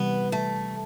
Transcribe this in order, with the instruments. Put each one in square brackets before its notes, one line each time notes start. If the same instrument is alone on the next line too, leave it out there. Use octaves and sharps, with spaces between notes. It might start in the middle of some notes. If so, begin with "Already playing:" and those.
Already playing: [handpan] C3 E3 G3 [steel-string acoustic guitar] B3
[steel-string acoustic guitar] A3